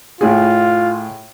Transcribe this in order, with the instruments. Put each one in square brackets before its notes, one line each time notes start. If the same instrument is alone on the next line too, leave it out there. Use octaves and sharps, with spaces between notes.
[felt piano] A2 G#4 [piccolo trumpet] F4